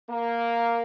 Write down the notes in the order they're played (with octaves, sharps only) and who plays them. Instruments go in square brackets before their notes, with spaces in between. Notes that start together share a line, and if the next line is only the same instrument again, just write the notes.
[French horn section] A#3